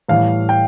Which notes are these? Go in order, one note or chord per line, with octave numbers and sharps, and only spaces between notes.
A2 E3 G3 F5
G5